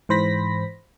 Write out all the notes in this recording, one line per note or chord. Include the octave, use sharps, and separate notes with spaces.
G#2 E3 C5 B5 A#6 B6